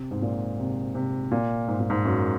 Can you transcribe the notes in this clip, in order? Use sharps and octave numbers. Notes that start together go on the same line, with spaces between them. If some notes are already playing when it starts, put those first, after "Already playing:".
Already playing: C3
G#2
A#2
C3
C3
A#2
G#2
A#2
G#2
F#2